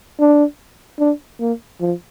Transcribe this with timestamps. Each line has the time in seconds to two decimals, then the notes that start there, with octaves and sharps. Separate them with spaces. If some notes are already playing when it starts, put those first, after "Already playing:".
0.20 D4
0.99 D4
1.40 A#3
1.80 F3